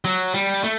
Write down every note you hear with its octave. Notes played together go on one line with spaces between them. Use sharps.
F#3
G3
A3